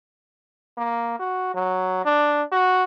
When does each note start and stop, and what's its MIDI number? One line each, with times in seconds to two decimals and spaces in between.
0.77 1.18 58
1.19 1.50 66
1.54 2.02 54
2.05 2.43 62
2.51 2.83 66